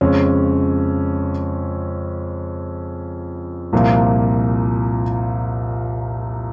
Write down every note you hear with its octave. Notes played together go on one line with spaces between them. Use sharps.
F2 C#3 G#3 C#4
C2 A#2 F3 A#3